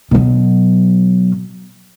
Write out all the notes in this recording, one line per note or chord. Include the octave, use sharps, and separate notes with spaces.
B2 F#3